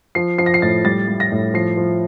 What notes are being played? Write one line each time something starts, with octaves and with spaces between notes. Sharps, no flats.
F3 C7
F3 C7
A#6
C7
A2 A6
G3 A6
G3
A#6
A2
F3 C7
F3